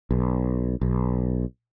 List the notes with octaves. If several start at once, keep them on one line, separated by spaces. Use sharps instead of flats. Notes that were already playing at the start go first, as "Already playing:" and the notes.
B1
B1